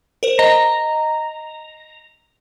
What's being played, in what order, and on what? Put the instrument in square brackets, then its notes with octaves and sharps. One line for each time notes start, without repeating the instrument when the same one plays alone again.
[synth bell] A#4 C5
[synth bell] D#5 [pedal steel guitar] A#5